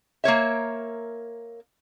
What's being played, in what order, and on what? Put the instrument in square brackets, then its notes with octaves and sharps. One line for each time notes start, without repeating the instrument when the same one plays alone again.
[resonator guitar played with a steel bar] A#3 A#4 C#5 E5